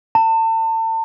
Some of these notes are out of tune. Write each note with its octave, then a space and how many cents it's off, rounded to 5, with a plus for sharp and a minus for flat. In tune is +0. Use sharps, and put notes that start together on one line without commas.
A5 +35